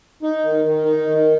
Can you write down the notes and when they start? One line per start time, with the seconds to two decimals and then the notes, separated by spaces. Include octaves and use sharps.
0.23 D#4
0.44 D#3
0.64 D#3
0.85 D#4
1.06 D#3